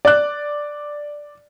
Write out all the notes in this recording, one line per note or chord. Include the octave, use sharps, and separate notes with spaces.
D5 F#6